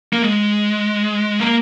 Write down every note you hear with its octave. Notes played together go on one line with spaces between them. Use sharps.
A#3
G#3
A#3